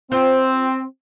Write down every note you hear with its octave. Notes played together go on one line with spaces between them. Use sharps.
C4 F4 C5